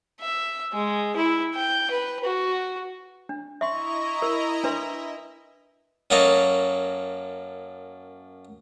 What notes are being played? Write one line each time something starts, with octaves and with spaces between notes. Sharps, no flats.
E5
G#3
E4
G5
B4
F#4
D4
E4 D#5 E5 A#5 C6 C#6
A#4
D4 B4 E5 C6
F#2 F#3 A#3 A4 C#5 D#5